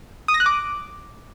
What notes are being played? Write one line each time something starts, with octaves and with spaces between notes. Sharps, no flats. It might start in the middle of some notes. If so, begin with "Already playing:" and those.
D#6
A#6
F#6
D6